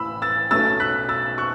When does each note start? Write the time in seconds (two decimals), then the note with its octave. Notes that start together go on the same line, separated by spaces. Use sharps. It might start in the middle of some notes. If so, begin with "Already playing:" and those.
Already playing: A1 A2 E3 B5 E6
0.22 E6 A6
0.51 B1 B2 A3 C#4 E6 A6
0.80 F#6 B6
1.09 E6 A6
1.38 C#6 F#6